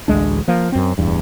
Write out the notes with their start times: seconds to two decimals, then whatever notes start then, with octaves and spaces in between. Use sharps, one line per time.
0.08 A1 D2 G#3 D4
0.48 F3 A#3
0.72 F#2 C4
0.98 D1 E2 G2